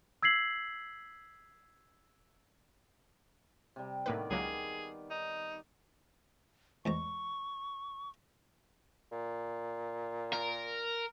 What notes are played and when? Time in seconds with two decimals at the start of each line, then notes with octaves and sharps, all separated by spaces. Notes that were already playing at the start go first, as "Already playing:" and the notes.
0.23 E6 G#6 B6 C7 F#7
3.76 C3 G3
4.06 A2 D#3 A#3 B3 B4 D5
4.31 C#2 F#3 A#3 G#4
5.10 D#4
6.86 E2 G#2 A#5 C#6
9.12 A#2
10.33 A#4